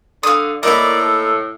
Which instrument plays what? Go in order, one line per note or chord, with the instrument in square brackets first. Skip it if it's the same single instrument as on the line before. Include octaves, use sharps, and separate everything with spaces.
[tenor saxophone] D3 [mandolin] F5 D#6
[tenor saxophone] A2 [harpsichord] A#3 D#4 E4 [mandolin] A#4 B5 [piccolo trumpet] D5
[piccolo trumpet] A4